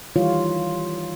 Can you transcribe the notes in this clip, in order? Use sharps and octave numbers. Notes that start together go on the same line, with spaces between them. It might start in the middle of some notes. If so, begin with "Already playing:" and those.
D#3 E3 G3 F4 C#5